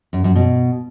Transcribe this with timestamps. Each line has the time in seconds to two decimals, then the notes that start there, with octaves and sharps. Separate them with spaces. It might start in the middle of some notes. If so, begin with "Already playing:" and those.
0.13 F#2
0.24 F#2
0.35 B2